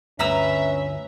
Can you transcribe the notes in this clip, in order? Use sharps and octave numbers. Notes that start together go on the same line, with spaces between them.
G1 D2 C#4 B4 E5 A#5 E6